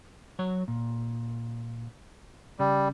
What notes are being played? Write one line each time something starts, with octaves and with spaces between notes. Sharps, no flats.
F#3 C#5
A#2
C#3 G3